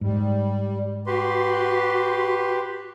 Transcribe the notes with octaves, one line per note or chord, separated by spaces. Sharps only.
G#2 G3
F#4 G4 B4 C6